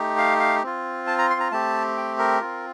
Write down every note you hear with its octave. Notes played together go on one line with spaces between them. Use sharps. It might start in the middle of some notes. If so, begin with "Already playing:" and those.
Already playing: A3 D#4 G4
F5
F5
C4 F4
A5
A#5
C6
A#5
A3 C4 G4 A5
G5
A#4
C4 F4